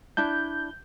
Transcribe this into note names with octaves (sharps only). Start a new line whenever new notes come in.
D4 E4 A5 G6